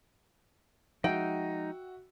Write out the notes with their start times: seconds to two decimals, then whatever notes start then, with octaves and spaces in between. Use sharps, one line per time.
1.04 F3 G#3 D#4 F#4 E5 G5